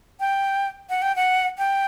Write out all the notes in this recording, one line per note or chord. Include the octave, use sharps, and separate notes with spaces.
G5
F#5
G5
F#5
G5